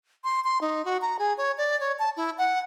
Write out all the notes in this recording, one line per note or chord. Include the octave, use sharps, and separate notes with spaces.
C6
C6
D#4
F#4
A#5
G#4
C#5
D5
C#5
A5
E4
F#5